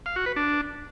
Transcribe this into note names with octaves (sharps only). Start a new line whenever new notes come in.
F5
F#4
B4
D4